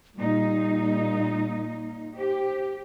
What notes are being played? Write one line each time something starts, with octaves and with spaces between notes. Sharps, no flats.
A#2 G3 D#4
G4 C5